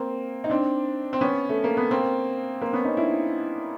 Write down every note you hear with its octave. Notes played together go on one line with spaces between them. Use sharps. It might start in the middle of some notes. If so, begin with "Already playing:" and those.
Already playing: A#3 C4
D#4
C4 D4
C4
B3 C#4
A3
A#3
B3
A#3 C4
A#3 C4
B3 C#4
C#4 D#4
D4 E4